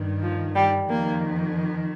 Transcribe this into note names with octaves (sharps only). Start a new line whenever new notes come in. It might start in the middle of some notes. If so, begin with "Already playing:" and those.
Already playing: G2 D#3
F3
G3
F2 D#3 A#3